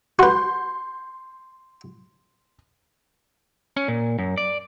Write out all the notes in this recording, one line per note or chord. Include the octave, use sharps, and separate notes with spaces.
F#4 B4 C6 G6
C#4
A#2
F#2
D5